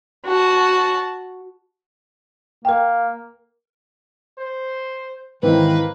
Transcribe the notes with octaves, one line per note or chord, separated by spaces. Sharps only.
F#4 A5
A#3 A#4 G5
C5
G#2 D#3 E3 A#3 C4 B4